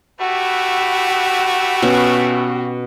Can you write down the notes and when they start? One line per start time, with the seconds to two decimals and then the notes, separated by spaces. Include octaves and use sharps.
0.20 A3 E4 F#4 G4 B4
1.82 B2 C#4